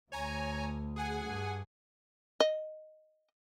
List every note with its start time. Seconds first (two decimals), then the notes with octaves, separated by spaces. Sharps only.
0.12 D2 C#5 G#5 A#5
0.96 G#4 F#5 G#5
1.24 G2
2.40 D#5